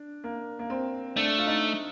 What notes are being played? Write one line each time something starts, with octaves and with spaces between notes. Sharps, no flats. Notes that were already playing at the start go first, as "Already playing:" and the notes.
Already playing: D4
A#3
A#3
C4
A3 D4
F4
D#4